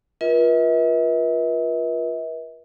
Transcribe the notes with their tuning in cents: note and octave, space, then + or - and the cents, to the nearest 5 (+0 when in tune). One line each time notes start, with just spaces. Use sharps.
F4 +0 B4 -45 E5 -45